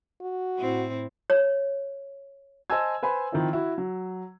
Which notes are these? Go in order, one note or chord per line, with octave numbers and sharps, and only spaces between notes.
F#4
A2 C4 E4
C#5
C5 D#5 G#5 A5 E6 G#6
B4 C5 G#5 B5
D#3 F3 C4 D#4 E4
E4 F#4
F#3